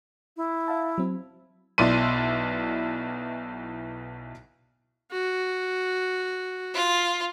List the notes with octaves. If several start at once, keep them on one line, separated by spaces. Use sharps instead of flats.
E4
E5 F5 A5
F#3 C4
B1 B2 E4 D5 C6 D#7
F#4
F4